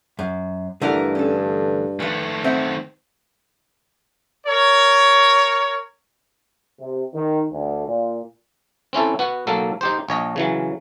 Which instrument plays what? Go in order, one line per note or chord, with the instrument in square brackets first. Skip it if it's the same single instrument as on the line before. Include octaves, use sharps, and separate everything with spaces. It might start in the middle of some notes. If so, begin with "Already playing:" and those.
[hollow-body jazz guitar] F#2
[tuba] G2 [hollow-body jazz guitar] D3 E3 A3 [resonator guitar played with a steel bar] E4 A#4
[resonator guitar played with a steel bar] C#4 A4
[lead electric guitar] D#3 A3 [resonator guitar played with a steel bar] F3 B4
[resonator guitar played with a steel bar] B3 E5 F#5 [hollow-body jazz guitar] C4
[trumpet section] A#4 C#5
[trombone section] C3
D#3
D2
A#2
[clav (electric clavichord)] C4 C#4 E4 A4
B3 F#4
B1 F#3 A#3 A4
D#4 G4 C5
A#1 C#5 D#5
C#3 E3 F#3